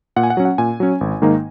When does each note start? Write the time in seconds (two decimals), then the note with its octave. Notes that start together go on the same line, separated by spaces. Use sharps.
0.16 A#2 F#5
0.23 G#5
0.30 F#5
0.37 F#3 C#4
0.45 F#5
0.58 A#2 G#5
0.80 F#3 C#4
1.01 G#1
1.22 G#2 D#3 A#3 D#4